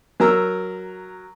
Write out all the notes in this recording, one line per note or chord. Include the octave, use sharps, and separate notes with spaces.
F#3 A#4 A#5 E6